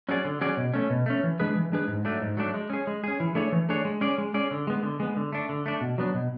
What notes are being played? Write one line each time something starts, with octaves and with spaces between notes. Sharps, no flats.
F#3 C#4 G#4 D5
D3
F#3 C#4 G#4 D5
B2
A3 C#4
B2
A3 C#4
E3
G#3 D4 G#4 B4
E3
G#3 D4 G#4 B4
G#2
F#3 A3 D4
G#2
F#3 A3 D4
G#3
C#4 G#4
G#3
C#4 G#4
E3
A3 D4 G#4 C#5
E3
A3 D4 G#4 C#5
G#3
C#4 G#4 D5
G#3
C#4 G#4 D5
D3
G#3 B3
D3
G#3 B3
D3
A3 D4
D3
A3 D4
B2
F#3 B3 D4
B2